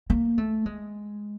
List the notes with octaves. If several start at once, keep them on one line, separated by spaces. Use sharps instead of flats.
A#3
A3
G#3